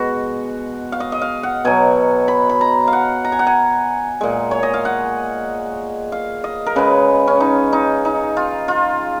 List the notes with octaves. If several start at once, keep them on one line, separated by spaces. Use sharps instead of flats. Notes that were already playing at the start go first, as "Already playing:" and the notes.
Already playing: B2 G#3 F#4
F5
D#5
D#5
F5
F#5
B2 F#3 G#5
B5
B5
A#5
F5
F#5
A#5
G#5
F#5
G#5
A#2 G#3
C#5
D#5
F5
F#5
F5
D#5
A#4
C#3 G#3 B4
C#4
D#4
D#4
D#4
F4
F4